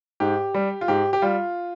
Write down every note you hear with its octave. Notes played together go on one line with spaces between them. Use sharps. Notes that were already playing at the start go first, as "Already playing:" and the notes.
G#2 G4
G3
F4
G#2 G4
G4
G3 F4